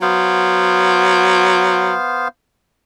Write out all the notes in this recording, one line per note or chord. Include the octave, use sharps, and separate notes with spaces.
F#3 B3 C5 F5